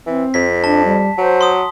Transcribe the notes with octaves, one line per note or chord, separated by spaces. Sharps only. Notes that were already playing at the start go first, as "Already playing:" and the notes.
E3 C4
F2 B6
D4 A5
G3
F#3 C5
C6 D#6